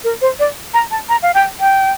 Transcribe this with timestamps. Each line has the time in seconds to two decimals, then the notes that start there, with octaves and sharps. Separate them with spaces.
0.04 A#4
0.21 C5
0.39 D5
0.74 A#5
0.91 A5
1.09 A#5
1.22 F5
1.34 G5
1.60 G5